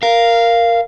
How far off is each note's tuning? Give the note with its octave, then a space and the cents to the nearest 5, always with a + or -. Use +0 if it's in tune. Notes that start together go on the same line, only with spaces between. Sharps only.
A#4 +0 F5 -10